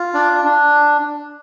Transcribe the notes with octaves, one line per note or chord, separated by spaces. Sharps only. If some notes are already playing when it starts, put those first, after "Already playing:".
Already playing: F4
D4 D5
D4